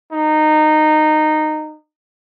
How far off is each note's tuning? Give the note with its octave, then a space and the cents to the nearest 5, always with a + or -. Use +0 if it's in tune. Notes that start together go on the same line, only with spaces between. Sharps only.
D#4 -15